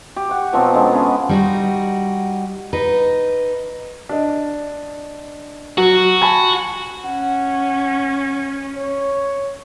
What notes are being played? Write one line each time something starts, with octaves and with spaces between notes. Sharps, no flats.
G4
F#5 C#6
B2 F3 F#3 C4
D3 G#3 C#4
B3 C#4 F5 G#5
G3 D#4 F#4
D#4 B4
D4 D#5
F#3 F#4
G#5 A5 B5
C#4 F#5
C#5